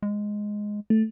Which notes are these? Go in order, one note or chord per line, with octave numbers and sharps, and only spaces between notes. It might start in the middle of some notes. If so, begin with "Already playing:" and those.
G#3
A3